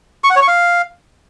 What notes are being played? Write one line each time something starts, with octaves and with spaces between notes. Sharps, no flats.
C#6
F#5
C#5
C#6
F5